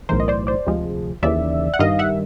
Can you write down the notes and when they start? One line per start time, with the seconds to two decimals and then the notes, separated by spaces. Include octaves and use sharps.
0.09 B1 A2 E3 A#4 C5
0.20 D#5
0.28 C5 D5
0.47 C5 D5
0.66 D2 C3 F3 G#3
1.23 D#2 C#3 E3 D5 E5
1.74 F#5
1.79 G2 D#3 G3 D#5 F5
1.99 E5 F#5